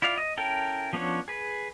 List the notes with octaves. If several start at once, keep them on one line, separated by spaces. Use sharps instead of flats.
E4 F4 D5 F5
D#5
C#4 E4 A4 A#4 G5
F3 B3 C#4 D4 C#5
G#4 B4